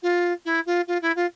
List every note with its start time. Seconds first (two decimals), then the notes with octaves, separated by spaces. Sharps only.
0.02 F4
0.45 E4
0.66 F4
0.87 F4
1.01 E4
1.15 F4